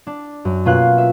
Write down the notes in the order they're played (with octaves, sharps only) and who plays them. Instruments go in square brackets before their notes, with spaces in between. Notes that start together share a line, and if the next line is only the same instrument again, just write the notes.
[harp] D4
F#2
B2 A#3 C#4 F4 F5 F#6
E5